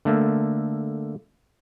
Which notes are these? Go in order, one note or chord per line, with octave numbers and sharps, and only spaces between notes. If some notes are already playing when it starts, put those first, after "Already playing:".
D3 A3 A#3